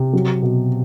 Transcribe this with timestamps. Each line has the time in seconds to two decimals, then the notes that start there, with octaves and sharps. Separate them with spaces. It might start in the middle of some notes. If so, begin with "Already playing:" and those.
Already playing: C3
0.13 F#3
0.42 B2